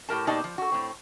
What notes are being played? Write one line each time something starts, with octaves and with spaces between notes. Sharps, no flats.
A2 G4 A#4 A5
B2 A#3 D#4 G4 D5 A5
F3
F#4 A4
A2 C4